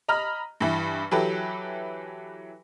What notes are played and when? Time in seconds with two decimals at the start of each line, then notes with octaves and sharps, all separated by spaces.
0.08 D#5 A#5 B5 F6
0.61 G2 E3
1.11 E3 F#3 G4 A4 B4